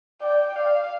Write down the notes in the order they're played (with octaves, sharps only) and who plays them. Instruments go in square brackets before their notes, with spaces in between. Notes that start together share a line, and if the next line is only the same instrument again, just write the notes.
[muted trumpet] D5 [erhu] G5
[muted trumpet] D5 [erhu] F5